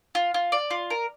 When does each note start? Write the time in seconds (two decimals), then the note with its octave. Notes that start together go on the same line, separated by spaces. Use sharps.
0.15 F4
0.34 F4
0.52 D5
0.71 F4
0.90 A#4